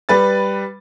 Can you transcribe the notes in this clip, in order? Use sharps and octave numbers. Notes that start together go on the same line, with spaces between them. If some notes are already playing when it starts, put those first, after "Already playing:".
G3 B4 A6